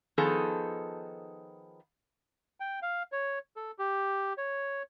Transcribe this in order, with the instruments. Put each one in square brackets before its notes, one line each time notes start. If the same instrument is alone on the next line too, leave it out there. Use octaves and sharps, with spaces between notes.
[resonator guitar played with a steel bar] D#3 F3 B3 D#4 G#4 A4
[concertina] G5
F5
C#5
A4
G4
C#5